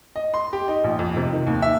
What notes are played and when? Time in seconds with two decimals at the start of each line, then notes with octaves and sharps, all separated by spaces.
0.16 D#5
0.34 C6
0.53 G4
0.68 D#4
0.84 A#1
0.99 F2
1.17 C3
1.32 D#3
1.47 D#2
1.62 E5